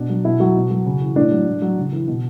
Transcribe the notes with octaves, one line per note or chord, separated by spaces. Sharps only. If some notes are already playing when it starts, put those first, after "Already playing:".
Already playing: B2 D4
F#3
B2 E4
F#3 F#4
B2
F#3
C#3
E3
A2 D4
F#3
A2
F#3
C#3
E3
B2